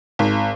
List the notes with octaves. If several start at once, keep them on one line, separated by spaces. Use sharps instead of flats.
G#1